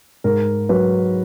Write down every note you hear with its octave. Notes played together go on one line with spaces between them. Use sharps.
G#2 A#4
F#3 B4